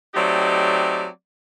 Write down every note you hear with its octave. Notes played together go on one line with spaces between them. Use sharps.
F#3 A3 C4 D#4 G4 D5